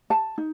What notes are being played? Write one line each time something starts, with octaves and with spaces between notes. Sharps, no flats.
A5
D#4